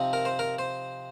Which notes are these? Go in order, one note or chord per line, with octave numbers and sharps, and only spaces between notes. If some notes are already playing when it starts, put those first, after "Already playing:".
Already playing: C3 F3 C4 D#4
A#4
C5
A#4
C5